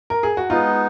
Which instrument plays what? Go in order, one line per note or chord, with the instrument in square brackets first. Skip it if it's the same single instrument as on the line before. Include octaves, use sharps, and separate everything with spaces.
[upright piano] A#4
G#4
F#4
[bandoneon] G#3 B3 D#4 [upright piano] F4